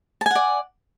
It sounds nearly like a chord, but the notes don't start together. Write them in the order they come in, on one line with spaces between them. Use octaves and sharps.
A5 G#5 F#5 D5